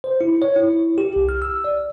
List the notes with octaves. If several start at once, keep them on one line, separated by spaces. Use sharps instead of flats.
C5
E4
C#5
E4
G4
C2
F6
E6
D5